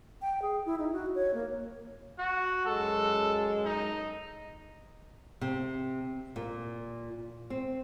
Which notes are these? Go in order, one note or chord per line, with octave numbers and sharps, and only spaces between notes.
G5
G#4
E4
D#4
F#4
C#5
A#3
F#4
F#2 G#3 A4
D#4
C3
A#2
C4